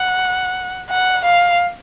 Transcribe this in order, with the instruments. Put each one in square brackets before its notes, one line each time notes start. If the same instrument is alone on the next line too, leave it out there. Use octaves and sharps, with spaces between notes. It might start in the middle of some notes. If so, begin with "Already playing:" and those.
Already playing: [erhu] F#5
F#5
F5